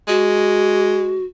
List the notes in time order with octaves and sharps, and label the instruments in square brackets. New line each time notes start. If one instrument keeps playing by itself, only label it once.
[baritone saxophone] G#3 [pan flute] F#4